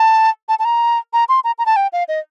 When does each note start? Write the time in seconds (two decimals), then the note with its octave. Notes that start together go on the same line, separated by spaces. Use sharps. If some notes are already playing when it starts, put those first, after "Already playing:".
Already playing: A5
0.49 A5
0.59 A5
0.65 A#5
1.13 A#5
1.29 C6
1.44 A#5
1.58 A#5
1.66 A5
1.76 G5
1.93 F5
2.08 D#5